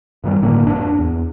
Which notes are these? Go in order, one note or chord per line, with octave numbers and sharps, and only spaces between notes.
G2 D#3 G3
G1 A2 D3 A#3
F2 G#2 D4
E2